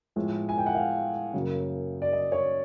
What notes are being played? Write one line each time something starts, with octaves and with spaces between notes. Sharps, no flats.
A2 F3 G#3 B3
G#5
G5
F#5
F5
F#2 C#3 F#3 A#3
D5
D#5
C#5